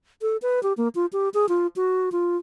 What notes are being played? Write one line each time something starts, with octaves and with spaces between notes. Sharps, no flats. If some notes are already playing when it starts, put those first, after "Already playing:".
A4
B4
G4
A#3
F4
G4
G#4
F4
F#4
F4